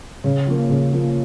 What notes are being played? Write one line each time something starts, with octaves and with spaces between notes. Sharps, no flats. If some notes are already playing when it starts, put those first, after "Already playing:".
C#3
F3 A#3
C#3
F3 A#3